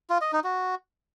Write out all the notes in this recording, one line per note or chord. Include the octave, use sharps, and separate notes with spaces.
F4
D#5
D#4
F#4